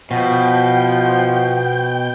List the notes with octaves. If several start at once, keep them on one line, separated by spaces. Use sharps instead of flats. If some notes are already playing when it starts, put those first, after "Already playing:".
B2 F3 F#5 G5